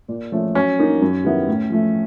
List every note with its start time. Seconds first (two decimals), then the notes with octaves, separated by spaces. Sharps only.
0.08 A#2
0.32 F3 A3 C#4
0.55 F#3 C#4
0.79 A#3 D#4
1.02 F#2
1.25 D#3 G3 B3 E4
1.47 A2
1.70 F3 A3